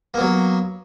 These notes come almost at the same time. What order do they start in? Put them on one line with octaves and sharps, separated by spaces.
A#3 B3 F#3